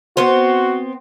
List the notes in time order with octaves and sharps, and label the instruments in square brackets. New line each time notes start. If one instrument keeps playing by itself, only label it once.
[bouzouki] B3 C4 C5 [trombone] F#4